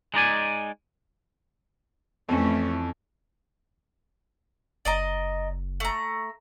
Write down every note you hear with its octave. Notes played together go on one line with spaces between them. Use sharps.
G#3 D#4 D5 G#5
F2 E3 A3 C#4
F#1 D5 D#5 A#5
A3 A#5